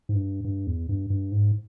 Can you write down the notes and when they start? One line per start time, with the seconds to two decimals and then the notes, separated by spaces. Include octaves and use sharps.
0.09 G#2
0.15 G2
0.44 G2
0.67 E2
0.89 G2
1.10 G2
1.32 G#2